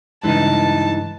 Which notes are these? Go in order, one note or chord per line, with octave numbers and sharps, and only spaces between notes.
G2 C#3 E3 G#3 D#4 A5